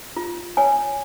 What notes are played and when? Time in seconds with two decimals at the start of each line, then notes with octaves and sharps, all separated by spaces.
0.16 F4
0.57 C#5 G#5